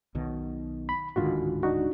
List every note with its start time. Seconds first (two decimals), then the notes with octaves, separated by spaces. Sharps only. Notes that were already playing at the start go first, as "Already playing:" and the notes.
0.15 B1 B2 D#3
0.89 B5
1.16 D1 G#2 D3 D#3 F4 F#4
1.63 D4 D#4 F#4